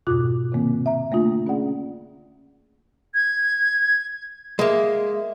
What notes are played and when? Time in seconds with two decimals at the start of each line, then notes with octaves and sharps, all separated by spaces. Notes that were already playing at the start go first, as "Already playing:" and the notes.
0.07 F2 G#2 B2 F4 D6 F#6
0.52 C3 D#3 A#3 C4
0.86 E5 A#5
1.11 D3 A3 A#3 D4 F4
1.47 C#4 G#4 D5 F#5
3.14 G#6
4.59 G#3 A#3 E5